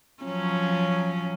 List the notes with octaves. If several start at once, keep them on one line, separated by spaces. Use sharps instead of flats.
F3 F#3 C#4